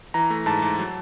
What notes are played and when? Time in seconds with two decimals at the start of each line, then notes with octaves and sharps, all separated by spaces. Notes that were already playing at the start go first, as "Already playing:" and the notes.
0.14 E3 A#5
0.30 A3
0.46 G#2 A5
0.62 G#2
0.79 F#3